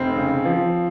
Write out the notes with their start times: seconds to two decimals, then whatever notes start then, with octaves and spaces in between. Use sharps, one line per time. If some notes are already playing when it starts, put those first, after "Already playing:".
Already playing: F1 C4
0.16 C#3
0.45 F3